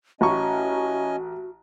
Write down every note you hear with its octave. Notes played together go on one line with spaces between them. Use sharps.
A1 C#4 F#4 D#5 G#5 C#6